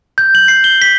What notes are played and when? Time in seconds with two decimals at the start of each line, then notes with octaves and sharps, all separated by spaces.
0.18 G6
0.35 F#7
0.48 C7
0.64 G7
0.82 B6